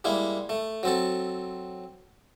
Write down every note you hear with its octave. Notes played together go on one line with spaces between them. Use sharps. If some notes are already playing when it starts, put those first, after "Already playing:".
G3 G#3 A#3 E4
A3
F#3 C4 A4